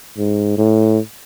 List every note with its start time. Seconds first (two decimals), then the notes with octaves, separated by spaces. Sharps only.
0.18 G#2
0.58 A2